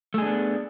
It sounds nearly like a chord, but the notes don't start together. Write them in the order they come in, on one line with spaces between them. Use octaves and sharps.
A3 G#4 D4 B3